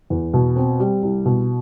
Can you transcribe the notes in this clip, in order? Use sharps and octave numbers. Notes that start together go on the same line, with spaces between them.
E2
B2
C4
G3
C2
B2